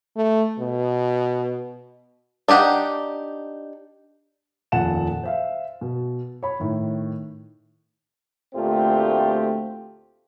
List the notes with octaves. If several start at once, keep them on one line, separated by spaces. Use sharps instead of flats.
A3
B2
D4 D#4 G4 F#5
D#1 F2 A#2 F#5 A5 E7
C5 E5 F5
B2
C#5 B5
A2 D#3
D2 A#2 A3 C4 F4 G4